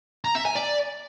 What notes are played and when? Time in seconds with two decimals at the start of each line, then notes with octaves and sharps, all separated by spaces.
0.25 A#5
0.35 E5
0.45 G#5
0.55 D5